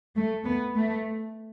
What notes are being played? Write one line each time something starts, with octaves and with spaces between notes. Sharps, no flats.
A3
B3
A3